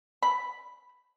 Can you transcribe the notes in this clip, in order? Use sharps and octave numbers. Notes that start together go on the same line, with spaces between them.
B5